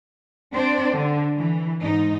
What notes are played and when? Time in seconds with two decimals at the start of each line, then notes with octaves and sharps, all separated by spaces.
0.52 C4 D4 C5 D5
0.95 D3
1.37 E3
1.80 G#2 D#4